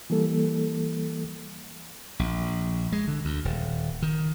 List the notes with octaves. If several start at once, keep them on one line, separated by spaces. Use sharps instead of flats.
E3 G3 A#3 A4
A#1
G#3
D3
D2
D#1
D#3